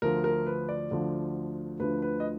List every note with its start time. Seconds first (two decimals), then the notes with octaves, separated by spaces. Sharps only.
0.02 D2 D3 F3 A#4
0.24 A#4
0.46 B4
0.69 D5
0.91 D2 D3 F3
1.80 D2 D3 F3 B4
2.02 B4
2.20 D#5